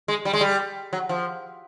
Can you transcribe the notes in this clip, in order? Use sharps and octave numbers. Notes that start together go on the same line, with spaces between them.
G#3
G3
G#3
G3
F#3
F3